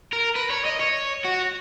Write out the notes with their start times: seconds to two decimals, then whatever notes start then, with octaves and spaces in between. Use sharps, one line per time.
0.13 A#4
0.35 B4
0.50 C#5
0.65 D#5
0.80 C#5
1.24 F#4